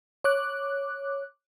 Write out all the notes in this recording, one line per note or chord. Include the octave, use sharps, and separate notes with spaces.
C#5 D6 F#6